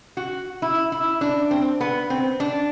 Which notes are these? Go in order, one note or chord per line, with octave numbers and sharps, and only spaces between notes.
F#4
E4
E4
D4
C4
B3
C4
D4